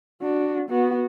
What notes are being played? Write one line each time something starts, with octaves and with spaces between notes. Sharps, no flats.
D4 F#4
B3 F#4